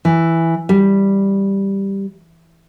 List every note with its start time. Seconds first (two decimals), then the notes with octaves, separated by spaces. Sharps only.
0.05 E3
0.69 G3